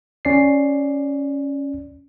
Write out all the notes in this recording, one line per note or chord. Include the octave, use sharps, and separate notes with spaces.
C#4 D5 C7